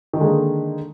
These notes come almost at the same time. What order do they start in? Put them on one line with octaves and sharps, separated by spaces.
D#3 D3 G#3 A#3